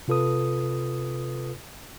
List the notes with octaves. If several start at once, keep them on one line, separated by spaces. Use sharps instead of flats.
C3 F4 A4 B4 D#6